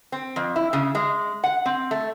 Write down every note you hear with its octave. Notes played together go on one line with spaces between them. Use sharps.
C4
F2
E4
C#3
G#3
F#5
C4
A3